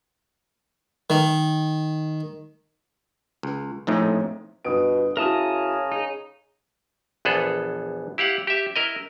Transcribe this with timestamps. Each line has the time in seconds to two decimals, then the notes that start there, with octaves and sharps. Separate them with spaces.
1.10 D#3
3.43 C#2
3.87 A#1 F2 A2 A3 C4 D#4
4.65 G1 B2 D#6 D7
5.17 C#3 E4 F#4 A#4 A5 D#6
5.92 D#4 G#4
7.25 A#1 E2 B3 G#4 A4
8.18 E4 G4 F5 F#5
8.47 G4 E5
8.76 E4 A#4 D#5